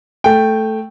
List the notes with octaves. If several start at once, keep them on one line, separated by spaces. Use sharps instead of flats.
A3 G5